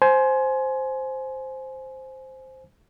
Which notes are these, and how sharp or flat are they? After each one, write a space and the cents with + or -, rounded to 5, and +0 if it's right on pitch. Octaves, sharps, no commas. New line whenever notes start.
C5 +0 G#5 +25